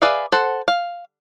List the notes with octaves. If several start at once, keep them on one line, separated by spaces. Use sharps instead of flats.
G#4 B4 D5 E5 F5
A4 C5 F#5
F5